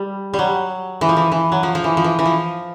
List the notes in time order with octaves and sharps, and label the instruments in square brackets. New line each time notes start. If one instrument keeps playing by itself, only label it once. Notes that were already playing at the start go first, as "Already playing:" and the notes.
Already playing: [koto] G3
G3
F#3
E3
F3
E3
E3
F#3
F3
F3
E3
F3
E3
E3
F3